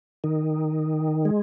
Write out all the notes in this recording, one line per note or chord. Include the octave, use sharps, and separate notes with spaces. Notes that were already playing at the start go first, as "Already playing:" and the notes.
D#3
G#3